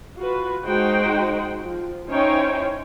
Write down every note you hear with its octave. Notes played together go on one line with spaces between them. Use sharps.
F4 F#4 B4
G#3 D#4 F#4 C5 F#5 G5
F3
C#4 D#4 E4 C5 C#5 G5